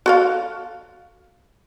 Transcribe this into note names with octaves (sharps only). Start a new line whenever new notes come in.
F#4 A4 F5